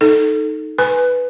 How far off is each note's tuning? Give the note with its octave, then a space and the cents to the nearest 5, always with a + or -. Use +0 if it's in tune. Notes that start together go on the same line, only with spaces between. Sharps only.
D#4 +0 A4 +0
B4 +0 G#5 +0